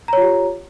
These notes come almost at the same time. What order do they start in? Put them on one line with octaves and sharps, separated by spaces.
A#5 C#5 F4 G4